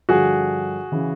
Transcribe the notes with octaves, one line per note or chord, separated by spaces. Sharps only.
G2 D3 F3 F#4 G#4
C#3 E3